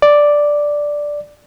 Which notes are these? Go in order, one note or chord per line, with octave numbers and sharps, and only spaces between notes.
D5